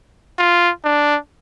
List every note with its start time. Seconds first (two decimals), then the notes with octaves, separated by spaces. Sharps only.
0.39 F4
0.85 D4